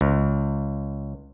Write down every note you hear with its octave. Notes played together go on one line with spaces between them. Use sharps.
C#2